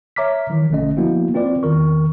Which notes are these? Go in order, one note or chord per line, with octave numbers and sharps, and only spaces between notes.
C#5 E5 A#5 D6 F6 B6
D#3 E3
A#1 B2 D3 A3 C#4 D#5
F3 A#3 B3 E4 F#4
C4 F4 B4 D5
E2 D#3 A#4 C#6